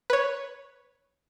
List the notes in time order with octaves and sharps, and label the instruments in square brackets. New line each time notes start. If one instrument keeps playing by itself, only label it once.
[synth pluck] B4 C#5